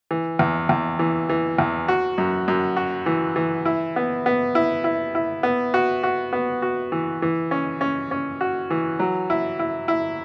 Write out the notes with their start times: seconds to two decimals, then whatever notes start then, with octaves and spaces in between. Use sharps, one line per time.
0.11 E3
0.39 E2
0.69 E2
0.99 E3
1.29 E3
1.59 E2
1.88 F#4
2.18 F#2
2.48 F#2
2.76 F#4
3.06 E3
3.36 E3
3.65 E4
3.96 B3
4.26 B3
4.55 E4
4.84 E4
5.15 E4
5.43 B3
5.74 F#4
6.03 F#4
6.33 B3
6.62 F#4
6.92 E3
7.22 E3
7.51 C#4
7.81 C#4
8.11 C#4
8.41 F#4
8.71 E3
8.99 F#3
9.30 E4
9.59 E4
9.88 E4